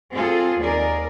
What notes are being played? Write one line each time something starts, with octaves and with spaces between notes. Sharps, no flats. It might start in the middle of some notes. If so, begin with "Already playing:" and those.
C4 F4 G#4 A4
D#2 G#4 A#4 D5